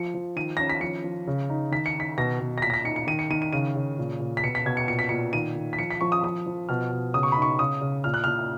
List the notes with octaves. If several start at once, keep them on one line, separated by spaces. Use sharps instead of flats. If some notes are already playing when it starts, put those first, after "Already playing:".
Already playing: F3 C#7
F3
D#3 D#7
C#4 A#6
B6
F3 C#7
F3
C#3
D#4
D#3 B6
C#7
D#4 B6
B2 A#6
B2
A#6
A#2 B6
A#6
B6
D#4 C#7
C#7
D#3 D#7
C#7
D#3 D#7
D#7
C#3 D#7
C#3
A#2
A#2
B6
B2 C#7
B6
B2 G#6
C#7
A#2 C#7
B6
A#2 C#7
D#3 D#7
D#3
B6
F3 C#7
B6
F3 C#6
D#6
F3 D#6
F3
B2 F6
B2
C#3 D#6
C#6
B5
D#4
C#6
C#3 D#6
C#3
A#2 F6
F#6
A#2 F6